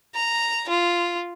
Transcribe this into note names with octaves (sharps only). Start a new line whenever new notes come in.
A#5
F4